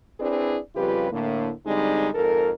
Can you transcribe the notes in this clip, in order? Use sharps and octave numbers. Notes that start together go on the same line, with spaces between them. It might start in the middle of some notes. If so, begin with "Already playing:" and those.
C4 D4 E4 G#4 B4 D5
F2 C#3 G3 F4 G4 B4
A2 D3 A#3
D3 G3 G#3 C4 D#4
F2 G#2 A4 A#4